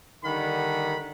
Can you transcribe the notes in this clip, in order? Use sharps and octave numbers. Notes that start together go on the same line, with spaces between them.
D3 D#3 G3 F#5 B5